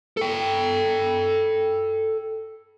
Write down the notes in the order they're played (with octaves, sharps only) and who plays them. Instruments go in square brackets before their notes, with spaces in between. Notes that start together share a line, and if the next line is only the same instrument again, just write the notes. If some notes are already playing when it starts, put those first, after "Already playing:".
[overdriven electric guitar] A4 G5